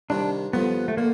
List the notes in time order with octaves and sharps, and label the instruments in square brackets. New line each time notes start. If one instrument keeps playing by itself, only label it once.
[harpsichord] C2 C3 D#3 [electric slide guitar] D4
[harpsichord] G2 D3 F3 [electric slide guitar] B3
[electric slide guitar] A3
[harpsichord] D3 [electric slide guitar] A#3